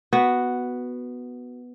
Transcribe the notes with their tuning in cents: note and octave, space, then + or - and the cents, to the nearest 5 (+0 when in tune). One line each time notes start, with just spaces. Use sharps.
B3 +0 F#4 +0